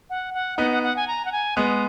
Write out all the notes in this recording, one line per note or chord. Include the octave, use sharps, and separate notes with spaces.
F#5
F#5
B3 D#4 F#5
F#5
F#5
G#5
A#5
F#5
G#5
G#3 B3 D#6